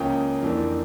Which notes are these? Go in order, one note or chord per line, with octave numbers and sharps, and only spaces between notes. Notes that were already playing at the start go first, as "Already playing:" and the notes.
Already playing: C#2 C#3 F3 A#3 C#4 G5
F2 E3 A#3 D4